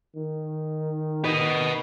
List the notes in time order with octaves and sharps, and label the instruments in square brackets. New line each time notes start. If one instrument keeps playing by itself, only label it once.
[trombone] D#3
[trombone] D#3 [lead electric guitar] B4 D#5